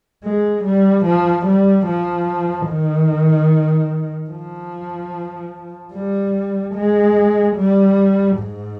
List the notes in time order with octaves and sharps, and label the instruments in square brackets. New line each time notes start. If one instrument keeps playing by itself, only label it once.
[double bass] G#3
G3
F3
G3
F3
D#3
F3
G3
G#3
G3
G#2